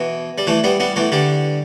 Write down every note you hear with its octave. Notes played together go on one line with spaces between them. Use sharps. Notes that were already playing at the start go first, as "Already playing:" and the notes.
Already playing: B2 E3
G3
E3 A3
G3 B3
G3 B3
E3 A3
D3 G3